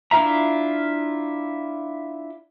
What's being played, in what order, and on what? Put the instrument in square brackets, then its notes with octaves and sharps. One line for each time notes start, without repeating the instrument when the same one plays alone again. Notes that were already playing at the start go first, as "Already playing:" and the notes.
[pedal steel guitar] D4 E4 F4 E5 A#5